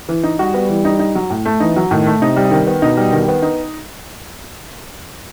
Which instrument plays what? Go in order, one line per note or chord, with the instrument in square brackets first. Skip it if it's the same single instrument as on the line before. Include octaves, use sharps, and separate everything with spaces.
[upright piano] E3
D#4
[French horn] G3 [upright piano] F#4
[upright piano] B3
E3
D#4
D#4
F#3
A2
A3
[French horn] E3 [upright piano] D#4
[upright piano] F#3
[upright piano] A2 [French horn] D#3
[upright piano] A3
[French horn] C3 [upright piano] D#4
[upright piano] G3
D#3
B3
[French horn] B2 [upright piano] D#4
[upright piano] G3
D#3
B3
D#4